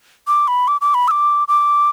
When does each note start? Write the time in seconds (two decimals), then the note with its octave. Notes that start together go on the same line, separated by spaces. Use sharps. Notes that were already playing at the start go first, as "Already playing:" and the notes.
0.27 D6
0.48 B5
0.68 D6
0.81 D6
0.94 B5
1.08 E6
1.11 D6
1.48 D6